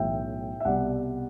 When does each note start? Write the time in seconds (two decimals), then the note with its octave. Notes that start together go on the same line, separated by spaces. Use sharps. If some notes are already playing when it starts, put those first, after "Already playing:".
Already playing: B1 A2 E3 E5 G5
0.60 E5
0.65 C2 B2 D5 F#5